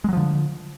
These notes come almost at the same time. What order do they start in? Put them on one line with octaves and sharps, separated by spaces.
G#3 F#3 F3 D3